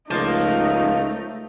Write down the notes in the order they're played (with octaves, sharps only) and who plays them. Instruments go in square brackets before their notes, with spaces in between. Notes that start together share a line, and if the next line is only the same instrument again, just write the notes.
[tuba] C#2 [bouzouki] F3 A#3 [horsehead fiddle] A3 D#4